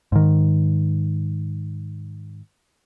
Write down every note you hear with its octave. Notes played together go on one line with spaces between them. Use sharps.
G#2 D#3